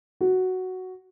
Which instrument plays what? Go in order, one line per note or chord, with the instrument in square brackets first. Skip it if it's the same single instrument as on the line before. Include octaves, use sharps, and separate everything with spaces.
[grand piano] F#4